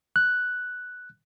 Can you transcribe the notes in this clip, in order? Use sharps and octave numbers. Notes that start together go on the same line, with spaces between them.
F#6